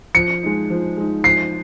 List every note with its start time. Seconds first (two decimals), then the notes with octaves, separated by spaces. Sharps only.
0.14 F3 C#7
0.43 G#3 D#4
0.70 F3
0.97 G#3 D#4
1.24 F3 C7